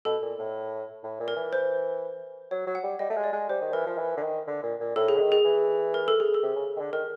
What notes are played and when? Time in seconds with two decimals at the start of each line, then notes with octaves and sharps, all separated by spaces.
0.05 B2 A4
0.22 A#2
0.39 A2
1.04 A2
1.20 A#2
1.28 A#4
1.36 E3
1.53 C5
2.51 F#3 C#5
2.67 F#3
2.75 F#5
2.83 G3
2.99 G3 D#5
3.10 A3
3.17 G#3
3.24 D5
3.33 G#3
3.49 G3 C5
3.61 D#3
3.73 E3 A#4
3.86 F3
3.98 E3
4.17 D3
4.23 D#3
4.47 D3
4.63 A#2
4.80 A#2
4.96 A2 A4
5.08 G#4
5.16 D3
5.21 D#3
5.32 G#4
5.45 E3
5.94 A#4
6.08 A4
6.20 G#4
6.34 A4
6.43 C3
6.56 C#3
6.76 D#3
6.80 D3
6.93 D#3 A#4